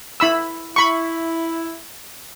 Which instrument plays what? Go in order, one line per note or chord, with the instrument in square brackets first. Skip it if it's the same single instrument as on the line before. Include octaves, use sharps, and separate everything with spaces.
[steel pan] E4 B5 E6
[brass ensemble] E4 [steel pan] B5 C#6